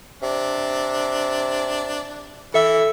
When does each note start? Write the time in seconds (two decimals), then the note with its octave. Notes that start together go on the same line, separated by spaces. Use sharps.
0.22 C3 D4
2.54 E3 A4 E5 E6